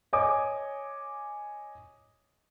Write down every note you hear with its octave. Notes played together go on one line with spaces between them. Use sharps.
C#5 D#5 G#5 D6 D#6